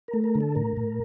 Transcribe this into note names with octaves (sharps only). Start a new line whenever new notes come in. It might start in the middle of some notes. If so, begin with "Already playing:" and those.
A#4
A3
A#4
D3
A4
A2 A#4
A2